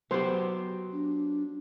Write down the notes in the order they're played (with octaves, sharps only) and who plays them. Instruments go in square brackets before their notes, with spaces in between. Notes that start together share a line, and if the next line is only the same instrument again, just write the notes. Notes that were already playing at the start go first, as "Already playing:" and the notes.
[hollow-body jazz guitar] F#3 B3 G4 [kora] C5
[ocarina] D4